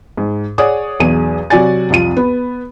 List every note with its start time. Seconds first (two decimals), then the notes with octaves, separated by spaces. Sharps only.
0.17 G#2
0.58 G#4 C#5 D5 F#5 D#6
1.00 B1 E2 G#4 D#7
1.50 C3 F#3 F#4 D5 G#5 A6
1.90 C2 F2 F4 D#7
2.17 B3